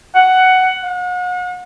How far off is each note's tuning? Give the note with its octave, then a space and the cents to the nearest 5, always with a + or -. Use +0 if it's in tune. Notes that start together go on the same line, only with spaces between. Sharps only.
F#5 +10
F#5 -40